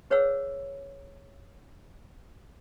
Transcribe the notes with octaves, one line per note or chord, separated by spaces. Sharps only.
G#4 B4 C#5 D5 F#5 E6